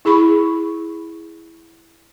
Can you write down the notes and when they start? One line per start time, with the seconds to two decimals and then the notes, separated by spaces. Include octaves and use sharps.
0.05 E4 G#4 B5 C#6